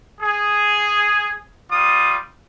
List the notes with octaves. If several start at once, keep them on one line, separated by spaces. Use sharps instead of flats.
G#4
G3 F4 D#6